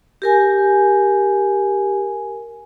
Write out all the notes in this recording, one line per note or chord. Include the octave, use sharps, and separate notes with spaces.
G4 A#4 G#5